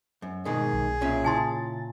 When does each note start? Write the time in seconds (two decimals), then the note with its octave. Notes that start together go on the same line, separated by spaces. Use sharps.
0.22 F#2
0.45 G#2 B2 D#3 G#4
0.73 B1
1.01 A#2 C#4 E5
1.25 C#3 E4 G#5 A5 C6 A6